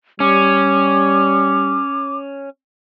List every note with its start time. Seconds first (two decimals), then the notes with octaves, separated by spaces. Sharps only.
0.20 G3 C#4 D6